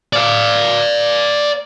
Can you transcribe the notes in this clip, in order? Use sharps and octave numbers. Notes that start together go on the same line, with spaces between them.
D5 F5